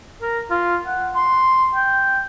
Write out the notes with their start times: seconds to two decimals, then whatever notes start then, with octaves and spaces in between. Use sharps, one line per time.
0.22 A#4
0.50 F4
0.87 F#5
1.15 C6
1.75 G5